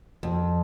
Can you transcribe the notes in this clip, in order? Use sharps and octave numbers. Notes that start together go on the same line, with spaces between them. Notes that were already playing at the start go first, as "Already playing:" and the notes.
F2